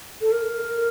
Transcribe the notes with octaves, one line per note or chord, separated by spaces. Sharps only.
A4
A#4